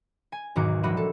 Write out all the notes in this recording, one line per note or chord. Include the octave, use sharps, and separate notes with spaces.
G#5
B1 E2 G#2 D#3 F#4 D6
A#1 G3 F#4 E5 B5 D#7
A4